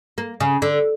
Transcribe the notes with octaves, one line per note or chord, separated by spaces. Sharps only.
A#3
C#3
D3